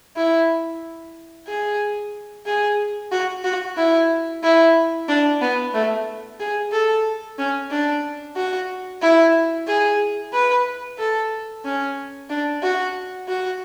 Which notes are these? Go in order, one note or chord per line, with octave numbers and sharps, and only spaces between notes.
E4
G#4
G#4
F#4
F#4
E4
E4
D4
B3
A3
G#4
A4
C#4
D4
F#4
E4
G#4
B4
A4
C#4
D4
F#4
F#4